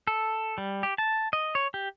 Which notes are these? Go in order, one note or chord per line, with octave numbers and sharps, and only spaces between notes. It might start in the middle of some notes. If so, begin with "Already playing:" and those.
A4
G3
G4
A5
D#5
C#5
G4